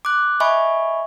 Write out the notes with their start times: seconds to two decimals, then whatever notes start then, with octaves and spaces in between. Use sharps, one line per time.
0.05 D6 F#6
0.40 D#5 E5 G#5 B5 C#6